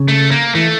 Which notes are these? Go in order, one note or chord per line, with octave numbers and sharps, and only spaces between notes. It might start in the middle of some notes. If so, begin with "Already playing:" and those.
Already playing: C#3
A3
A#3
E3 A3